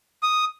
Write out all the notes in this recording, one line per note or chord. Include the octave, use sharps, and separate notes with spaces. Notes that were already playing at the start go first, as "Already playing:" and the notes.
D#6